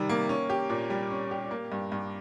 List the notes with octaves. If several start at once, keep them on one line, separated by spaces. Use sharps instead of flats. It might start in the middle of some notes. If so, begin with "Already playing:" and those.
Already playing: C3 D#3 G3
A#3
C#4
G4
A#2
G3
C#4
G4
A#3
G2
G2